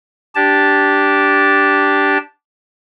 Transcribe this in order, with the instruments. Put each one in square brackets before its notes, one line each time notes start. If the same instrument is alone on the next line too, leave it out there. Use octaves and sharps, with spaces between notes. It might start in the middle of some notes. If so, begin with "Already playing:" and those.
[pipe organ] D4 G4 A5